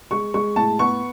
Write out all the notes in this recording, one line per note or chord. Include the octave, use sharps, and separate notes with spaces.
G#3 C#6
G#3 C#6
A2 A5
B3 C#6